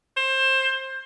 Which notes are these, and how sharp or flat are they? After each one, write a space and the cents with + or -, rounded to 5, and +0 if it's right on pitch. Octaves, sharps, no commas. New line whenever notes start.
C5 +20